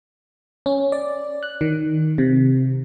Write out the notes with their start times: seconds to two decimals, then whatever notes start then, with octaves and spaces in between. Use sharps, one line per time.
0.66 C#4
0.92 D5
1.43 F#6
1.61 D#3
2.18 C3